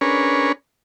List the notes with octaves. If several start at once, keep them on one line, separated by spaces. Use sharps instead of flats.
C#4 D4 G#4 A#4 B4 C#5